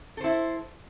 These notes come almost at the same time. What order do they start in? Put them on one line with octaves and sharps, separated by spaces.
A4 C5 E4